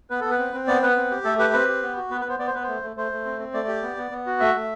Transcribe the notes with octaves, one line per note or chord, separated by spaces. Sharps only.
B3 B4
B3 A4
B4
C4
C4
B3 D5
B3 B4
C4
G4
A3 A4
G4 B4
C4 B4
G4
B3
F#4
B3 B4
B4
B3 C5
B3 D5
C5
B3 B4
A3 C5
A3
A3 C5
A3
C4
C4
A3 D5
G4
B3
B3
B3
F#4
A3 E5
A3